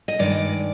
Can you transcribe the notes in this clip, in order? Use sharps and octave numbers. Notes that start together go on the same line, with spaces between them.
D#5
G2 D#3 G#3 D5